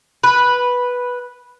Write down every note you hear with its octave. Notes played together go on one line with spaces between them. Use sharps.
B4